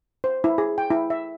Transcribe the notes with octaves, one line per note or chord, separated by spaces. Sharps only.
C5
E4
G#4
G5
E4
E5